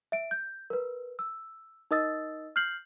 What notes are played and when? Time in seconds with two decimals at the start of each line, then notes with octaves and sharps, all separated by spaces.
0.12 E5 D7
0.31 G6
0.70 A#4 B4
1.19 E6
1.91 D#4 A#4 D#5 D#6 E6 A6
2.56 F6 G6 C7 F#7